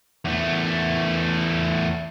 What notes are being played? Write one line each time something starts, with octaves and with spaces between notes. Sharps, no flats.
E2 A3